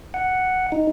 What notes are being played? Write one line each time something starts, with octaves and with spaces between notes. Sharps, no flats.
F#5
D#4